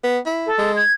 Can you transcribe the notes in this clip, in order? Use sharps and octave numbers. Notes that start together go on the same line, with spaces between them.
B3
E4
A4
G#3
G#6